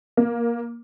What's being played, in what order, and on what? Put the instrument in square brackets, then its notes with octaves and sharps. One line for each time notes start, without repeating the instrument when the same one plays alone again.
[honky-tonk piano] A#3